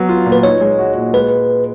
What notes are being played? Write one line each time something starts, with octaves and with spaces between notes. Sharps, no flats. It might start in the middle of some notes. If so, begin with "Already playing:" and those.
Already playing: F#3 B3
F4
A#2
B4
D#4 C#5
G#3
F#4
A#2
G#3 B4